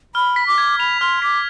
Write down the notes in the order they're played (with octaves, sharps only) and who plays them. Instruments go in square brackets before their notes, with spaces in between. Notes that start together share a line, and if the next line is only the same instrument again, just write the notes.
[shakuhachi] B5 [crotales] F6
[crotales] B6
[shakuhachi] D6
[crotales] G#6
[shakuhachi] B5 [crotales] F7
[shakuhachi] C6 [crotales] F6
[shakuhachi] D6 [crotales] B6